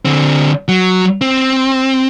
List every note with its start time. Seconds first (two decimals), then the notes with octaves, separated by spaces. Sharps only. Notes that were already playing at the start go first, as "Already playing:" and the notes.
0.05 D3 C4
0.68 F#3
1.21 C4